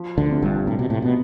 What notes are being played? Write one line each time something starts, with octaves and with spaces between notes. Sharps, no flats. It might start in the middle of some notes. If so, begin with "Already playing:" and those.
Already playing: F3
D2 D3
C3
G1 G2
A2 C3
B2
A2
B2 B3